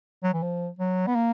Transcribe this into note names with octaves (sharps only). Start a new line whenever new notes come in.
F#3
E3
F3
F#3
B3
A#3